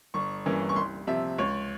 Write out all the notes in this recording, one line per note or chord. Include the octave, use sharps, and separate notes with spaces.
G1 C#6
G2 E3 A#3 C#4
C#6
C2 C6
C3 F3 E5
C#2 C#5